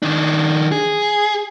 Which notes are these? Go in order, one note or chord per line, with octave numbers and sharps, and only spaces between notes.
D#3 D4
G#4